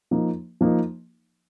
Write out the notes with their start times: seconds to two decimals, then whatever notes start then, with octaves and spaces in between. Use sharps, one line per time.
0.11 F3 A#3 D#4
0.61 F3 A#3 D#4